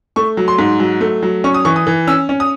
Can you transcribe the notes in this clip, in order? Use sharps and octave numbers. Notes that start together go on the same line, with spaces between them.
A3 C#6
F#3
C6
G#2
F#3
A3
F#3
C#4 C#6
D#6
E3 C#6
D#6
E3
C#4 E6
C#4
D#6